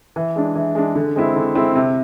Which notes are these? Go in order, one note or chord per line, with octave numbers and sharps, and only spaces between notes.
E3
G#3 D4
E3
G#3 D4
D3
G#3 C4 E4
D3
G#3 C4 E4
C3